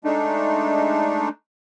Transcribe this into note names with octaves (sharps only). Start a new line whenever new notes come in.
G#3 A3 D4 D#4